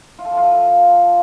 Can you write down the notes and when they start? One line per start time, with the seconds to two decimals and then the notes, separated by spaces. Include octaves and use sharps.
0.19 F4
0.25 A4
0.31 F3
0.37 F4